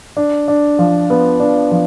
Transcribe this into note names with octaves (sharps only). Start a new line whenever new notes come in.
D4
D4
F3
B3
D4
F3